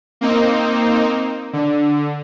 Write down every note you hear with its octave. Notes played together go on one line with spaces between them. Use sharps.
A#3 C4 D#4
D3